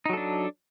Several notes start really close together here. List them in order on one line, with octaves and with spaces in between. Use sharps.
D#4 F#3 A4 D4